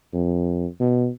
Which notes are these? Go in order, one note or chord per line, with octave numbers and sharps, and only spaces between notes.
F2
B2